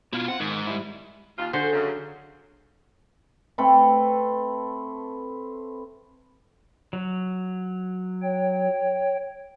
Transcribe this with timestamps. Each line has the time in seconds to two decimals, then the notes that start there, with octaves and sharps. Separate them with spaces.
0.13 B2 E4 F4
0.28 C4 E4 F4 F#5
0.40 G#2 D#3
0.67 G3 E4
1.38 D#2 F4
1.53 D3 F#4 G#4 C5
1.73 F#2 C#3
3.58 A3 C4 A4 B4
6.93 F#3
8.23 C#5 G5